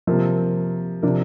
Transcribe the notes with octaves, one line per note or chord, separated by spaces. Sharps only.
C3 F3 A#3
C3 F3 D4 A#4